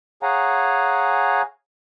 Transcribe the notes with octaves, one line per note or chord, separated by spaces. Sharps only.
G#4 C#5 F5 F#5 G#5 A#5